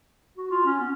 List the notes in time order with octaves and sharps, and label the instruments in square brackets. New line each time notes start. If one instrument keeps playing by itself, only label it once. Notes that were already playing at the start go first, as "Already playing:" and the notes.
[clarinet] F#4
F4
C#4
B3